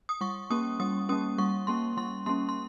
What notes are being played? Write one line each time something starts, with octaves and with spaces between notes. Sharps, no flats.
D#6
G3 C#6
A#3 C#4 D#6
G3 D#6
A#3 C#4 D#6
G3 C#6
A#3 C#4 C6
G3 C6
A#3 C#4 C6
C6